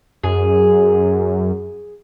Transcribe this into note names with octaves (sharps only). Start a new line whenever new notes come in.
F#2 G#4